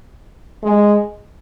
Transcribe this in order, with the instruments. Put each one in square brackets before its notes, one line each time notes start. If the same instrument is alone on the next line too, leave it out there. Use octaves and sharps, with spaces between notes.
[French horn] G#3